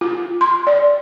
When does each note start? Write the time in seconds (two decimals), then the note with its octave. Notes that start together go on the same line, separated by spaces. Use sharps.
0.01 F4
0.41 C6
0.67 D5